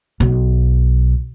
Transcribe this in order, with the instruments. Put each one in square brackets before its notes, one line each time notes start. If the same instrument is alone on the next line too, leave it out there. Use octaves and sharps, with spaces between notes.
[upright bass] B1